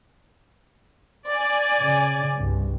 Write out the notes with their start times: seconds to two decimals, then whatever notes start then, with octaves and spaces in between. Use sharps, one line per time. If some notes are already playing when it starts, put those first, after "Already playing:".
1.29 D5 G#5
1.80 C#3
2.34 C2 G2